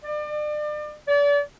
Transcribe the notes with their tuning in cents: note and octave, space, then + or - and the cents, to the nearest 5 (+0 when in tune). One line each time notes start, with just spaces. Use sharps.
D5 +35
D5 -35